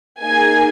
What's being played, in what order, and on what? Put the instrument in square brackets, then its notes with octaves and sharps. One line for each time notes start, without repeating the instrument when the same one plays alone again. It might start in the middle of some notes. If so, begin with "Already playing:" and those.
[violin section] A#3 D#4 G#4 G#5